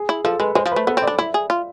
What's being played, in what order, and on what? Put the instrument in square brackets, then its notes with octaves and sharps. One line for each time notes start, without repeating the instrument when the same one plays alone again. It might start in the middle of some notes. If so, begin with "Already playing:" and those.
Already playing: [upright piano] G#4
[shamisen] E4
[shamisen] F3 [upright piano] A4
[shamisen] G#3 [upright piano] B4
[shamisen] G#3 [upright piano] C5
[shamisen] F3
[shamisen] A3 [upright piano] B4
[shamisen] B3 [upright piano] A4
[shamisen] C4
[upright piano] D5
[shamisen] D4
[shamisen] E4 [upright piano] E5
[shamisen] G#4
F4